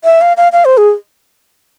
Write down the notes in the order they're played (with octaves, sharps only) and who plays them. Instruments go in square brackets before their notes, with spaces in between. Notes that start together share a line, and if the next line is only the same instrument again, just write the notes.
[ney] E5
F5
F5
F5
C5
G#4